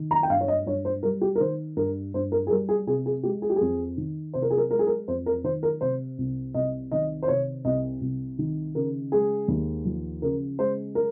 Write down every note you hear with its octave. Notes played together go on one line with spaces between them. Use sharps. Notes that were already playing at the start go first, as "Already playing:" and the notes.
Already playing: D#3
A#5
G5
G2 F5
C#5
D#5
G2 C#5
C5
G3 A#4
G4
A#4
D#3 C5
G2 A#4
G2 C5
A#4
G#4
G3 A#4
G#4
C3 G#4
G#4
G#3 G4
G#4
G4
F2 G#4
D#3
C3 C5
A#4
G#4
A#4
G#3 A#4
G#4
A#4
F2 C5
A#4
D#3 C5
A#4
C3 C5
C2
C2 D#5
D#3 D#5
C5
C3 C#5
C2 D#5
C2
D#3
C#3 A#4
G#3 G#4
D#2
F3
C#3 A#4
G#3 C5
A#4